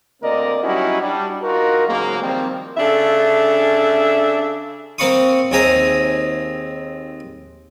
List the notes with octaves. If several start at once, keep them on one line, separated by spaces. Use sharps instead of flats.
D2 A#3 C4 A#4 D5 D#5
F#3 G3 C#4 D#4 E4 F#4
G3 D4
D#4 F4 F#4 A#4
G#2 C#3 F#3 A#3
D#3 F3 G3 A#3 C4
C#3 D4 A4 E5
A#3 C4 F5 B5 C#6 D#6
D#2 C4 G#4 E5 A#5 D#6